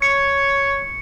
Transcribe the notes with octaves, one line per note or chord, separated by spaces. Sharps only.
C#5 C#7